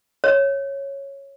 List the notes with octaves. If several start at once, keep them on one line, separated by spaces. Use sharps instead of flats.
C#5